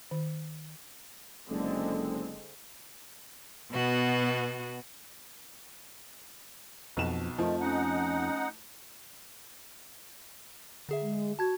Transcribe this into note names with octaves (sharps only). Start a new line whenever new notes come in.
D#3
F#1 D3 G#3 C4
B2 B3 F#4
B1 F2 B2 E7
F2 D#3 F3 A3 D#5
C#4 D#4 F#5
D3 G#4 E5
G#3
F#4 A5 G#6